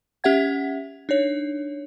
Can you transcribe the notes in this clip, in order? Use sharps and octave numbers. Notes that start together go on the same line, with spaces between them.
C#4 G4 E5 F#5 G#6
D4 D#4 C#5